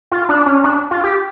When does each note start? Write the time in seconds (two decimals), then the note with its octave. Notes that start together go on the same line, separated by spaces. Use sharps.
0.12 F4
0.29 D4
0.46 C#4
0.64 D4
0.91 F4
1.04 G4